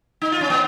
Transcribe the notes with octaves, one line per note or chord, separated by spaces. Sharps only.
D#4
F4
C#4
B3